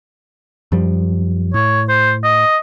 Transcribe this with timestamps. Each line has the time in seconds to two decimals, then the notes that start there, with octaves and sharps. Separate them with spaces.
0.72 F#2 F3 G3
1.54 A2 C#5
1.89 C5
2.24 D#5